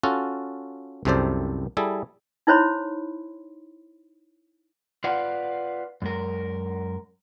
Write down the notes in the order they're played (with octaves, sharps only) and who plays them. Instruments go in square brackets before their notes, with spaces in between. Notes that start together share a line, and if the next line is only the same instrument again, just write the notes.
[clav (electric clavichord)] C#4 F4 F#4 A4
C2 F#2 C3 A4 C5 D5
G3 E4 G#4 A4
[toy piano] D#4 E4 C5 C#5 B5 C6
[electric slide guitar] F4 B4 D5 F5 F#5
F#2 G#3 A#4